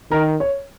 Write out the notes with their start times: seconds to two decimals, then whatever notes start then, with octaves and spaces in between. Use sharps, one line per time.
0.11 D#3 A#4
0.40 C#5